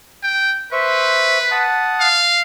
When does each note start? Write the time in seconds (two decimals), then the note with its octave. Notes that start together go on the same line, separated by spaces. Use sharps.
0.23 G5
0.72 B4 C5 E5 C#6
1.51 F#5 A5 D#6
2.00 F5